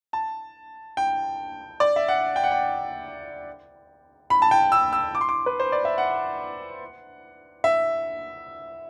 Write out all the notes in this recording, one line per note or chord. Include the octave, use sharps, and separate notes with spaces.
A5
G5
D5
E5
F#5
G5
F#5
G5
B5
A5
G5
E6
E6
D6
C6
D6
B4
C5
D5
E5
F#5
E5